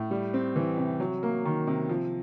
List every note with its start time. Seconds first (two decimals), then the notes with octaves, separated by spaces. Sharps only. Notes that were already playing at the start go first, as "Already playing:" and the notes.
Already playing: A2
0.11 G3
0.34 C4
0.56 E3
0.78 C3
1.00 F#3
1.23 A#3
1.45 D#3
1.67 C3
1.89 F3